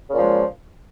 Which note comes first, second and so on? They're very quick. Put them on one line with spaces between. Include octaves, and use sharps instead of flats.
C#3 A#2 F3 G#3